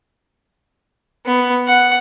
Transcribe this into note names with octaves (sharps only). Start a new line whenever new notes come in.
B3
F#5